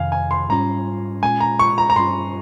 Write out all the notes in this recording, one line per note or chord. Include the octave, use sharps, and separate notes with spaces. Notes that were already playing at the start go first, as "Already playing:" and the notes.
Already playing: F2 C3 D#3 F5 G#5
G#5
C6
G#2 G3 C#4 F4 A#5
A#2 G#3 C#4 F4 G#5
A#5
C#6
A#5
A#5
G2 G3 C#4 F4 C6